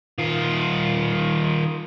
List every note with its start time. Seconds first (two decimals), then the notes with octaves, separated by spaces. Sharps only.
0.19 D#3 F4